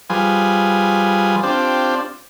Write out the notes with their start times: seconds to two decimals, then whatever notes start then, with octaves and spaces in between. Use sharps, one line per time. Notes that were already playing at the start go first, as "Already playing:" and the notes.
0.10 F3 G3 F4 G#4 B4 G#5
1.43 C4 D4 F4 G4 C5 D5